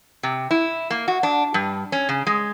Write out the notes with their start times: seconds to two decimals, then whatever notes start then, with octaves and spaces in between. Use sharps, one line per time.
0.23 C3
0.51 E4
0.90 A#3
1.08 F#4
1.23 D4
1.54 G2
1.92 C#4
2.09 C#3
2.27 G#3